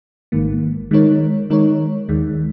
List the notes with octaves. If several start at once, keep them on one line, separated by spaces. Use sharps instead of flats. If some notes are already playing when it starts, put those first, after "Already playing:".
G#1 G#2 D#3 A#3
D#3 G#3 D#4 A#4 C#5
D#3 G#3 D#4 A#4 C#5
D#2 D#3 G#3